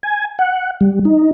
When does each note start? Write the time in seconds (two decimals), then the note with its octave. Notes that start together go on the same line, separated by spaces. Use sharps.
0.03 G#5
0.39 F#5
0.81 G3
1.05 D#4